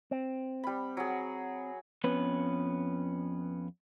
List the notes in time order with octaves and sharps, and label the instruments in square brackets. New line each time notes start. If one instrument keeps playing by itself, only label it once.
[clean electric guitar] C4
[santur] G3 B5
F#3 G#4
[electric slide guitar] F2 B3 C#4 B4